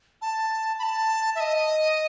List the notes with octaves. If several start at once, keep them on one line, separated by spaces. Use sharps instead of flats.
A5
B5
A5
E5
D#5